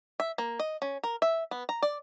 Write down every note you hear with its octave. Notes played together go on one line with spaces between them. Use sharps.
E5
A#3
D#5
C#4
A#4
E5
B3
A#5
D5